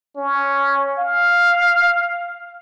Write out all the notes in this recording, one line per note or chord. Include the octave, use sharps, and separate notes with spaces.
C#4
F5